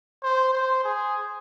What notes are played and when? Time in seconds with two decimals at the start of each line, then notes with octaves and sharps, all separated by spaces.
0.23 C5
0.54 C5
0.84 G#4